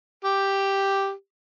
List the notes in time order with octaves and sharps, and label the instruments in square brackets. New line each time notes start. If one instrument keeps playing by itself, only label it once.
[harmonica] G4